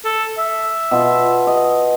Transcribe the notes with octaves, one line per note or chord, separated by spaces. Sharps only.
A4
E5
B2 F4
D#5